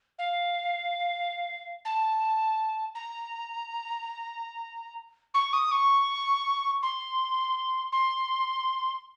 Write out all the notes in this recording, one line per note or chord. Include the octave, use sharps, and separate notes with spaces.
F5
A5
A#5
C#6
D#6
C#6
C6
C6